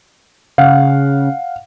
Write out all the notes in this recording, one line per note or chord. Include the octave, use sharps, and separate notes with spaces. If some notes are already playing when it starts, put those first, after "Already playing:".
C#3 F5 F#5